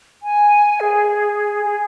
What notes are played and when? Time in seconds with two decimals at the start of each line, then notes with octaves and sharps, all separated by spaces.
0.23 G#5
0.80 G#4
1.65 G#4